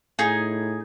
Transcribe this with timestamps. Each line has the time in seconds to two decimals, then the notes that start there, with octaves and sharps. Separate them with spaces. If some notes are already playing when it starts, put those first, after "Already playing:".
0.19 A2 D#4 G#4